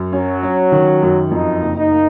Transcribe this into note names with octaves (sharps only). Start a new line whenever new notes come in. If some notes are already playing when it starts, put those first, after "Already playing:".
Already playing: F#2
F#3 C#4
C#4
D#3
F#2
F2 D#4
F#1
D#4
A#3